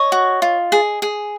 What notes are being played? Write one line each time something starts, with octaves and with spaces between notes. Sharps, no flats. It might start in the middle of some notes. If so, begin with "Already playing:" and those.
Already playing: C#5 D#5
F#4
F4
G#4
G#4